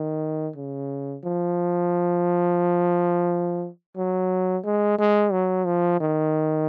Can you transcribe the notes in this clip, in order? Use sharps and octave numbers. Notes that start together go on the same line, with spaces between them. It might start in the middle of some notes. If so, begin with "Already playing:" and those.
Already playing: D#3
C#3
F3
F#3
G#3
G#3
F#3
F3
D#3